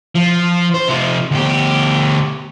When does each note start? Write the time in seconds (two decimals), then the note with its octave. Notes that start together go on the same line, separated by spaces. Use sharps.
0.15 F3
0.75 C5
0.88 C3 F3
1.31 D2 G4